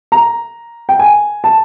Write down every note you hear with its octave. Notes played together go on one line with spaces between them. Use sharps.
A#5
G5
G#5
A5